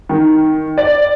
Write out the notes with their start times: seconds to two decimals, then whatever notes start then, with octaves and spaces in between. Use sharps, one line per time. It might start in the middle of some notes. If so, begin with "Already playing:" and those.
0.09 D#3
0.78 D5